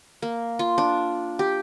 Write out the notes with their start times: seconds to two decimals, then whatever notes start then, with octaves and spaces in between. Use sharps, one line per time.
0.22 A#3
0.59 F4
0.78 D4
1.39 G4